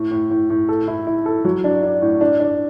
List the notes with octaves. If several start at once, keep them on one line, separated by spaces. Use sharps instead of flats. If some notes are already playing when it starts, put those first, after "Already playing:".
Already playing: A2
A2
A2
A2
A4
E4
E4
A4
F#3
D4
D4
A2
D4
D4